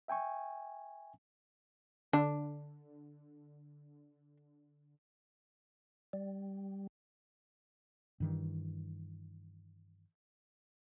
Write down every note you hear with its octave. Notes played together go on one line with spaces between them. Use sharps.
E5 G5 G#5 C#6
D3 D4
G3
G2 D#3 E3